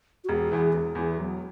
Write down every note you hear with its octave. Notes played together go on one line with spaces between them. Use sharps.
F#4
E1 G#4
E2 E3
E1 G#4
E2 E3
E1 F#3